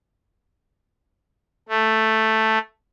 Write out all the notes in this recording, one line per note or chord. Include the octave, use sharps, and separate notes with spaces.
A3